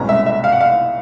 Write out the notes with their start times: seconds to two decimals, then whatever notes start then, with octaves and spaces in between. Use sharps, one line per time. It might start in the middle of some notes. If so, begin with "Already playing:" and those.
Already playing: C2 B2 G#3 C#4 A#5
0.09 E5
0.26 E5
0.44 F5
0.52 F#5
0.61 F5